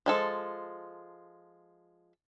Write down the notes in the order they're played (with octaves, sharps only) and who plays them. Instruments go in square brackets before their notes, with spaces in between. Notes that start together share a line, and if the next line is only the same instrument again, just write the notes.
[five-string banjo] F3 G#3 A4